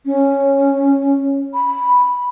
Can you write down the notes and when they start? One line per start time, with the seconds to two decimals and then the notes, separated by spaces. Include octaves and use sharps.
0.06 C#4
1.54 B5